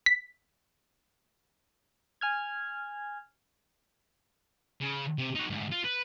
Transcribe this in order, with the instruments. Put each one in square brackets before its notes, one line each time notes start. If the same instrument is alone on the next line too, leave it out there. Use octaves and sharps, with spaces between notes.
[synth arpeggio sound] B6
[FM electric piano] G#5 F6 G#6
[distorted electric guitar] C#3
C3
D#4 F#4
D2 G#2
F4
B4